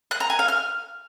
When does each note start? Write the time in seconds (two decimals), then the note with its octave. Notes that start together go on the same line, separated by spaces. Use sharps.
0.11 F#6
0.20 A#5
0.30 G#5
0.39 F5
0.48 F6